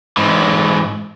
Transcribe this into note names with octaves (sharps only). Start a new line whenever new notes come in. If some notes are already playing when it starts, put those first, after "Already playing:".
G#2 E3